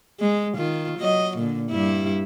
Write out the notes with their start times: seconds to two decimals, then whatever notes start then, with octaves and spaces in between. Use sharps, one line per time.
0.20 G#3
0.55 D#3 F4
0.99 F#3 D#5
1.38 A#2 D3
1.71 G2 G3 E4